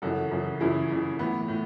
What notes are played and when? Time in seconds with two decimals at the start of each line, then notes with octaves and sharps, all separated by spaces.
0.02 F#2 C#3 E3 F#4 A4
0.31 F#2 C#3 E3
0.60 F#2 C#3 E3 E4 G#4
0.90 F#2 C#3 E3
1.19 A2 E3 B3
1.48 A2 E3